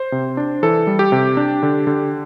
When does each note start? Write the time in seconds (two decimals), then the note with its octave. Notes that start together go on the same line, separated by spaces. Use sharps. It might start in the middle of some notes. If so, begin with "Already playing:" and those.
Already playing: C5
0.12 C3
0.37 D4
0.63 E3 A4
0.87 G3
0.99 G4
1.12 C3
1.37 D4
1.63 D3
1.87 D3